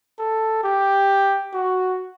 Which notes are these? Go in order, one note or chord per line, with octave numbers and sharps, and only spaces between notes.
A4
G4
F#4